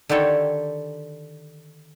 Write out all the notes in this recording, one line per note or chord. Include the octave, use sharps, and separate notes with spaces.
D3 D#3 G4 A4 C#5